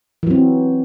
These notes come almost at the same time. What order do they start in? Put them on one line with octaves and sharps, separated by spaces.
E3 F#3 C4